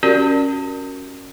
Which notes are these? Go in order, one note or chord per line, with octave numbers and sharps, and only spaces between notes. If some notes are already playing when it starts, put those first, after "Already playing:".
C#4 F#4 G4 A#4 D5